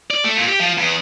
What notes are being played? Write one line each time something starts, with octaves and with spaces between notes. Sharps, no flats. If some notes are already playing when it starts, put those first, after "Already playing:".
D5
A3
A#2
G4
F3
E2